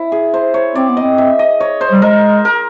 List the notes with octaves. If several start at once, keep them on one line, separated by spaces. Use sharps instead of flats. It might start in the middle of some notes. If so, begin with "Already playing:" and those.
Already playing: E4
G#4
C5
C#5
C4 D5
B3
C4 D#5
E5
D#5
C#5
C5
G3
G#3 A#4
A#4